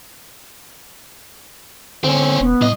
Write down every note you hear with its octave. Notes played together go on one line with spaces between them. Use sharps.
D3 C4 C#4
E1 B3
C2 A2 D#5